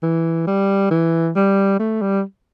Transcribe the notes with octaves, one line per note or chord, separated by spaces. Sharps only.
E3
G3
E3
G3
A3
G3